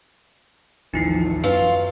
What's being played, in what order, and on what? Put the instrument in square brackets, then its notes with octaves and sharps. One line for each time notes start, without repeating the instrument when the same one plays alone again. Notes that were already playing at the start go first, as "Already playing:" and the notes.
[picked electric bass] A1 D#2 F3 [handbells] D#4 E4 C7
[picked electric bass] F#2 [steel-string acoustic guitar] F4 [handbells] B4